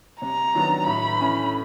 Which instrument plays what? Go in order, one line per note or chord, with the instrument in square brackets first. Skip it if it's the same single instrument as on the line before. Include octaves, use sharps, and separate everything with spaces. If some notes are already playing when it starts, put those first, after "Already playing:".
[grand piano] C3 [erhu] A#5
[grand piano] D#3 F#3 B3 D4
[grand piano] A2 [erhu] B5
[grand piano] E3 A3 C#4